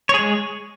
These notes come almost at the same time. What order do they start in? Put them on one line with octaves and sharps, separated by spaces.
C#5 G#4 G#3